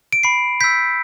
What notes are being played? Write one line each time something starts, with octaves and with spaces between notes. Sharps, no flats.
D7
B5 C7
E6 G6 B6